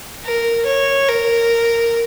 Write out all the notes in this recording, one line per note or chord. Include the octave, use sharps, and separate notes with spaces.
A#4
C#5
A#4